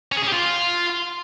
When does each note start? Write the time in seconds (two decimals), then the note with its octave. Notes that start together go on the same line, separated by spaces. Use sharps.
0.12 C#4
0.17 G#4
0.22 C#4
0.27 G4
0.33 F4